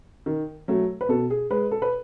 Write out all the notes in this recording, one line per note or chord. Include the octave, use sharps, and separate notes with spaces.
D#3
F#3 A3
B4
B2 A4
G#4
G#3 B4
A4
B4